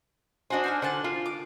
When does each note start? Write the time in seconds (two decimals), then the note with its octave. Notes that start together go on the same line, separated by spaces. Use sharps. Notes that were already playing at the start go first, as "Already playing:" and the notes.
0.50 D4 F#4 C5 D#5 G#5
0.64 D#4 G#5 F6
0.82 D3 C5 F#5 A5
1.04 A#3 F4
1.26 D6